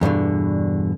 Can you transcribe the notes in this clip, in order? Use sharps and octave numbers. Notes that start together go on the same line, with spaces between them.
E2 G2 B2 D3